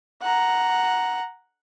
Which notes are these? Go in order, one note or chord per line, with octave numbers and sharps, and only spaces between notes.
F#5 A#5